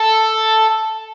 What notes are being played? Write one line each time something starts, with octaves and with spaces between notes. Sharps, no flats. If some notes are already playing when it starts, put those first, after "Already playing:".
Already playing: A4